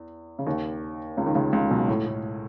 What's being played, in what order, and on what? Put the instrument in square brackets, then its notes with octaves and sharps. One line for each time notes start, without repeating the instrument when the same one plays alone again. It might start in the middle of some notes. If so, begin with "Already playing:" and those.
Already playing: [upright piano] E2
C#3
D#2 D#3
C#2 C#3
D#3
C#2 C#3
C#2 C#3
B1 B2
A2
A2